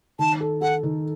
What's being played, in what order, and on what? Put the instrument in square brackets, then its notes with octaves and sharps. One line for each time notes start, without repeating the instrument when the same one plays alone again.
[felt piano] D#3 [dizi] A5
[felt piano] A4
[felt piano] A4 [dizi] F#5
[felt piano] D#3